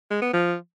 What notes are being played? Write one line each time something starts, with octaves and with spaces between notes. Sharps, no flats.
G#3
B3
F3